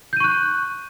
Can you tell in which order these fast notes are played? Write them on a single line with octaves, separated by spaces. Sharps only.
G6 D#7 C#6 F#6